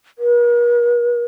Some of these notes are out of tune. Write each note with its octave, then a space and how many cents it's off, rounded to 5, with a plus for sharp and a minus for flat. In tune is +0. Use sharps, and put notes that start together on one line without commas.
A#4 +45